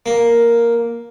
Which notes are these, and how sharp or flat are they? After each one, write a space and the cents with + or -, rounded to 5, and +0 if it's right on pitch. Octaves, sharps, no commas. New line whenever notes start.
A#3 +0